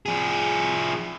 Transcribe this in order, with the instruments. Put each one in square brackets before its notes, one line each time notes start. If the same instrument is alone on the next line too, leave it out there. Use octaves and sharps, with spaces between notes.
[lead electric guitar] F3 G#4